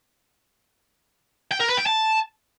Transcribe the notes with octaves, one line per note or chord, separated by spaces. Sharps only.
G5
A#4
B4
G5
A5